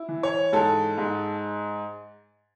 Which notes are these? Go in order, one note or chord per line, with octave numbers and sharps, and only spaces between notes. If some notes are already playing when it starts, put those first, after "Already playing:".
Already playing: E4
E3
C#5
G#2 A4
G#2